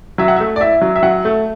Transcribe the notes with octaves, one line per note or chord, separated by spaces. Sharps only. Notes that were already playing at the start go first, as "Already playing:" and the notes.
F#3 E5
F#5
E5
A3
D5
E4 E5
F#3
E5
F#3 F#5
A3